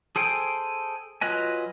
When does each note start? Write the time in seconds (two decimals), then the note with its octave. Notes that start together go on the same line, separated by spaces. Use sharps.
0.16 G#4 A4 C5 G5 G#5
1.21 F#3 F4 B4 D#5 G#5